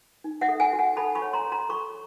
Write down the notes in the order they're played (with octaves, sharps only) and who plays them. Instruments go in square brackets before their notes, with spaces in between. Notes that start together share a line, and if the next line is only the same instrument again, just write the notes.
[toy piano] D#4
E5 F#5
A4
F#5 G#5
F#4
F#5 G#5
A4 A5 B5
B5 C#6
C#5
A#5 C6
C#5
A#5 C6
A4 B5 C#6